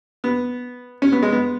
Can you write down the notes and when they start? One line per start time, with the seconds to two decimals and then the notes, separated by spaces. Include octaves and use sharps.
0.24 B3
1.02 C#4
1.12 B3
1.22 G#3
1.32 B3